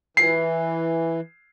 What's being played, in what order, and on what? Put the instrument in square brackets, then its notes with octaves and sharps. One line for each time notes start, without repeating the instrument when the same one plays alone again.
[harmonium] E3 [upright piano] C7